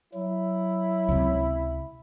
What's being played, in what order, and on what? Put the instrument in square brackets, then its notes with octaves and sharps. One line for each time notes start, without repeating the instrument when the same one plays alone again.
[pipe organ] F#3 [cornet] E4
[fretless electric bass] C#2 C3